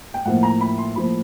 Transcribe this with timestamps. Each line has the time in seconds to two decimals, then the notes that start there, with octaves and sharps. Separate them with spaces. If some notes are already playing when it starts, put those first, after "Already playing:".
0.14 G5
0.25 A2 F3 A#3 F#5
0.43 A#5
0.61 B5
0.78 C6
0.96 A2 F3 A#3 B5